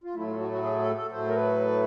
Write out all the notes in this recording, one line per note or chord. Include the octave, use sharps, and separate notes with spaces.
F4
A2 F#3 A3 E4
F4
F#4
F#4
G#4
A4
A4
A2 F#3 A3 C5
A#4
B4